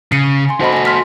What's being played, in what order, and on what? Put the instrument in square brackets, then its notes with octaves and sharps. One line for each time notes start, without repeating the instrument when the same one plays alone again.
[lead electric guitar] C#3 [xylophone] C7 C#7 D#7
[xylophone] G#5 C6
[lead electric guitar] F#4 A4 [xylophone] C5 D#5 B5
[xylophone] G#5 A#6
C6 F6 B6